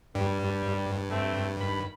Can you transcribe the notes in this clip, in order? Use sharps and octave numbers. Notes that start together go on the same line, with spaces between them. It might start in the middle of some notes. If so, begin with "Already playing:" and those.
G2 G3
A3 C4
D#3 B5